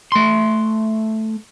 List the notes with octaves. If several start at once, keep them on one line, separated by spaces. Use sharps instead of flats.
A3 C6